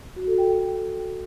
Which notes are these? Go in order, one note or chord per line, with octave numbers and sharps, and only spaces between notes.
F#4
A4
G5